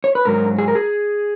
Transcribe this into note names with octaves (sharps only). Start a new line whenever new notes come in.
C#5
B4
G#2 F#3 A#4
G#4
A#4
G#4